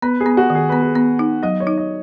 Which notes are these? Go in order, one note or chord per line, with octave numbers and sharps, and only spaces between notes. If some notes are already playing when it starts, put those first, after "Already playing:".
B3 B4
G#4
B3
F#4
D#3
G#4
B3 B4
G#4
B3
D#4
F#3 D#5
C#5
D#4
D#5